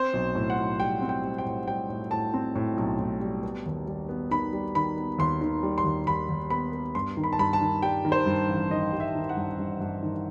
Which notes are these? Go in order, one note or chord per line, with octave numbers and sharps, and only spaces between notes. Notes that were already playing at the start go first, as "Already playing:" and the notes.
Already playing: C4 C5
B1
A2
F#5
B1
G3 G5
C4
G5
G3
G5
A2
G3 G5
A2
A2 A5
C4
A2
B1
A2
G3
B3
D#2
G3
B3
D#3 B5
G3
D#3 B5
B3
D#2 C6
D#3
G3
C6
D#2
D#2 B5
D#2
B3 B5
B3
G2 C6
D#3
B5
A5
G2 B5
A5
D#3
G3 G5
D#3
C5
G2
A1
D#3 D#5
G2
E5
D#3
F#5
G2
G2
G2
D#3